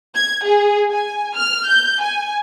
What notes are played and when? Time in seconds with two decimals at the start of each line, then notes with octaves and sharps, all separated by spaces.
0.16 G#6
0.46 G#4
0.91 G#5
1.36 F6
1.67 G6
2.01 G#5